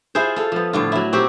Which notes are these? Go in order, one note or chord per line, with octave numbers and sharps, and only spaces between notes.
E4 F4 G#4 C5
F4 A4
F3 B3
A2 D3 F4
F#3 E4
A#2 C4 F#4 G4